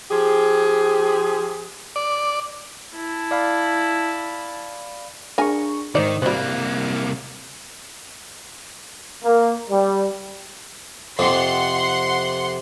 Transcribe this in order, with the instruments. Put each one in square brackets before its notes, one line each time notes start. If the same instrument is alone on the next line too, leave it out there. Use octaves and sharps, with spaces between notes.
[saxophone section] F3 G4 G#4
[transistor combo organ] D5
[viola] E4 A5
[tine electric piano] D5 F5 B5
[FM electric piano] D4 G#4 C#6 [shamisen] A#4 G#5
[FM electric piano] G#2 D#4 [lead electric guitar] D#3 [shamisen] C5 D5
[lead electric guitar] C2 A#3 [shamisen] G3 C5 [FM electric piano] F#6
[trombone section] A#3
G3
[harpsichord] F2 C3 [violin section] F#5 C6